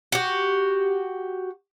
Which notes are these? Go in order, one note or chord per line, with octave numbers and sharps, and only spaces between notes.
F#4 G4